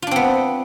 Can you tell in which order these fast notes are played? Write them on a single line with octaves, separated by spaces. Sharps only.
F4 D4 C4 B3